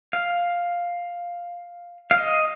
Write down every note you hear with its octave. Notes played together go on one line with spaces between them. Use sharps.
F5
F5
D#5